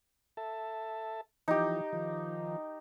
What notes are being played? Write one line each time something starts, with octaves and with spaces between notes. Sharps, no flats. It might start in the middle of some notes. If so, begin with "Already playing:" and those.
A4 E5 A5
E3 F3 D#4 G4
D#3 F3